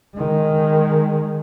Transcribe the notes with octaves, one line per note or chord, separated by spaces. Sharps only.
D#3 G#3